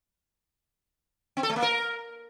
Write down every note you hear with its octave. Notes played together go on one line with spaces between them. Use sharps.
C4
A4
A3
A#3
A#4